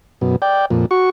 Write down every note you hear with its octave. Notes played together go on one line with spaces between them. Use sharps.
F#2 B2
D5 G5
F2 A#2
F#4 C#6